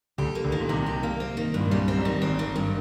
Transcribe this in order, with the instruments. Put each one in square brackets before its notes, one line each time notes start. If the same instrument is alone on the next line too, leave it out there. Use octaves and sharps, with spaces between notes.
[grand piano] D2 D3 [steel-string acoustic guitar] G4
[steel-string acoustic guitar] A#3
[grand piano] D2 D3
[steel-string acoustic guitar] D#3
[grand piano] A#2
[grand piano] C2 C3 [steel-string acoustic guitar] D#4
[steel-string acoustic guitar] G4
A#3
C4
D#3
G2
[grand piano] A#2
[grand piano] C2 C3 [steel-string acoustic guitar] G3
[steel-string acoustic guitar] C4
[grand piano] G#1 G#2
[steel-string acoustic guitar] D#3
[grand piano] G#1 G#2 [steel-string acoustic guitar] C4
[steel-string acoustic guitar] D#3
G2